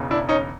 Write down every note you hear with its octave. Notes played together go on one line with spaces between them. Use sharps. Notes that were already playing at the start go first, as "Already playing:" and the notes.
Already playing: E1 E2 C#3
D4 E4
C#4 D#4